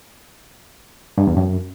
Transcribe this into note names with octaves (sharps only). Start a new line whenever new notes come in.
G2
E2
F#2